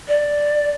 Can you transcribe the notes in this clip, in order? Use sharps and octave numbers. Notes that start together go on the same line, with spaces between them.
D5